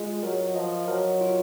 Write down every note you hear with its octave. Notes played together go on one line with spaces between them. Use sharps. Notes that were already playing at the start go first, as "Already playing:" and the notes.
Already playing: G#3 F4 D#5
F#3 A#4
F3 D#5
F#3 A#4
F4